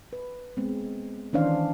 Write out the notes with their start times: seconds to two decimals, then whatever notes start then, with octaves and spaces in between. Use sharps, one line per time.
0.13 B4
0.57 G#3 B3 C4
1.33 D#3 E3 C#4 D4 C5 F5